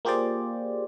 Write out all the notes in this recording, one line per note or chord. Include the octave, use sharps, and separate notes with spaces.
A#3 F4 G4 G#4 C5 D5